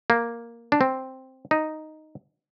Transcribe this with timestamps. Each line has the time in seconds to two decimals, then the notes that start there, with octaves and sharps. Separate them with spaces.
0.10 A#3
0.72 D4
0.81 C4
1.51 D#4